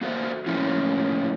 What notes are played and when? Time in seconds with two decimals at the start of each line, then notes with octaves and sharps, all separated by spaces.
0.01 A#3 F#4 A4 C5 E5
0.46 A2 F3 A#3 C#4 E4 F4